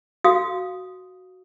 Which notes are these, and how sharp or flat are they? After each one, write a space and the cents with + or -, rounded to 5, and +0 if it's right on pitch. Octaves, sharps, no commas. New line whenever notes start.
F#4 +0 F5 +0 D#6 +0